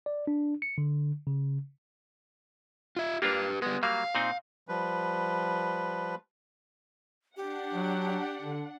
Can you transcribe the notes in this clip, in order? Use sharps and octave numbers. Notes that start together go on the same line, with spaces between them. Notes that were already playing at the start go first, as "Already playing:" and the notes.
D5
D4
C#7
D3
C#3
F4 E5
A#3 D4 F4 G4 B4
G3 G#3 B3
F#3 G3 A#3 F5
A#2 C4 D#4
F3 G3 B4
D4 G4 F#5
F#3
D3